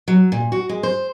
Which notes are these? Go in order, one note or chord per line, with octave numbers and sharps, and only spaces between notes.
F#3
A#2
F#4
G#3
C5